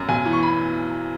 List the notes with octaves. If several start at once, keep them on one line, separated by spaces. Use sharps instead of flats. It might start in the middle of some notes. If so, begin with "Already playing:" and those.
Already playing: F#2
B1 G#5
E3
C#6
B5